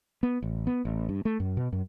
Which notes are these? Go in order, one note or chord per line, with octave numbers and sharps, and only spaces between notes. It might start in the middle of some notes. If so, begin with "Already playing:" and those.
B3
A1
B3
A1
G2
A3
F#2
B2
F#2